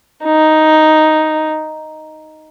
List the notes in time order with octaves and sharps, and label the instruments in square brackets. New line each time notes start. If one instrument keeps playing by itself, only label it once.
[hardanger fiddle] D#4